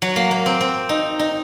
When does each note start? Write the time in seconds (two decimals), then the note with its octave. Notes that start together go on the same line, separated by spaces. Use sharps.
0.02 F#3
0.16 A#3
0.31 A#3
0.46 C4
0.61 C4
0.89 D#4
1.19 D#4